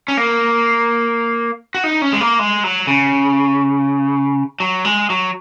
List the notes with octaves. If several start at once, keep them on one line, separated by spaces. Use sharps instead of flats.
C#4
A#3
F#4
D#4
C#4
G#3
A#3
G#3
F#3
C#3
F#3
G#3
F#3